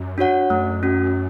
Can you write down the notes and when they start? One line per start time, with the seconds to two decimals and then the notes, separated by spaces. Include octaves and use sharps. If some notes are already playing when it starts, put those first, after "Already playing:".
Already playing: F#2
0.18 D4 F#4 C#5 F#5
0.50 F#2 A3
0.83 C#4 F#4